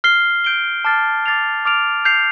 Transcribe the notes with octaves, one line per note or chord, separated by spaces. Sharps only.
F6 C7 G7
G6 D7 G7
A5 D6 F6 A6 C7
D6 A6 C7 F7
D6 F6 D7 F7
G6 C7 F7